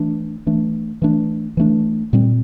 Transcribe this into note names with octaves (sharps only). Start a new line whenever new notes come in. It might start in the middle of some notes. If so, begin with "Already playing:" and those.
Already playing: E3 A3 D4
E3 A3 D4
E3 A3 D4
E3 A3 D4
A#2 G3 C4